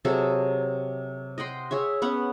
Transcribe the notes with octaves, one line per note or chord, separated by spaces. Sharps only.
C3 F#3 G#4 A4
D#5 F#5 G5 C6
G#4 C#5 E5
B3 C#4 F#5